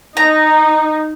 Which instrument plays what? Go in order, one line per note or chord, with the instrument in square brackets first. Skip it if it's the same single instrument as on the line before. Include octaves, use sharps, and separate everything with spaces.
[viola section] D#4 [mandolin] A#5